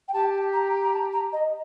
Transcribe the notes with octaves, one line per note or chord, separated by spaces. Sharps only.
G5
G4 A5
A#5
A#5
A5
A#5
D#5